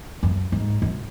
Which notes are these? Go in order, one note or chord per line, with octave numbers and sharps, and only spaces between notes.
F#2
G#2
F#2